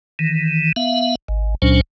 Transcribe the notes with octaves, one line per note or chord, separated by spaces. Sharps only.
D#3 E3
B3 E5 F5
G#1
C#2 A#2 F#3 C#4 D4 C5